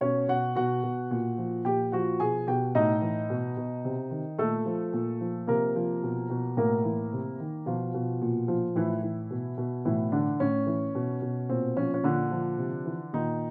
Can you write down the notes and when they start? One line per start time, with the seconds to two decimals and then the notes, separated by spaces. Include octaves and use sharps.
0.01 B2 C#4 C#5
0.28 B2 F#4 F#5
0.55 B2 F#4 F#5
0.83 B2
1.11 A#2
1.38 F3
1.65 A#2 G4 G5
1.92 F3 F#4 F#5
2.20 B2 G#4 G#5
2.47 B2 G4 G5
2.75 A2 D#4 D#5
3.02 E3
3.30 B2
3.57 B2
3.85 C3
4.11 D#3
4.38 A#2 A3 A4
4.66 F3
4.93 A#2
5.21 F3
5.47 C3 A#3 A#4
5.76 F3
6.03 B2
6.30 B2
6.57 A2 A#3 A#4
6.84 E3
7.13 C3
7.40 D#3
7.66 B2 F3 F4
7.94 B2
8.21 A#2
8.48 F3
8.75 A2 E3 E4
9.03 E3
9.31 B2
9.58 B2
9.85 A2 E3 E4
10.12 D3 E3 D4
10.40 A2 C#4
10.67 E3
10.95 B2
11.22 B2
11.49 A#2 C4
11.77 F3 C#4
11.94 C#4
12.03 A#2 D3 D4
12.31 F3
12.58 C3
12.86 E3
13.13 A#2 D#3 D#4